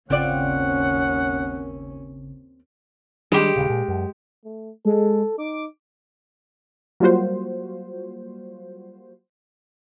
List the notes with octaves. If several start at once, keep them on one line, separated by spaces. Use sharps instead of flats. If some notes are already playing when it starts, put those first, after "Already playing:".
G#1 D#2 C#3 C4 C#4 F4 D5 F#5
D#3 G3 G#3 D4 G4
D#1 C#3
A#2
F#2
A3
G#3 A4
D#4 D6
F#3 G3 A#3 F4 F#4 C5